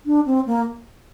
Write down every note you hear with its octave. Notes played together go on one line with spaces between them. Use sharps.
D4
C4
A#3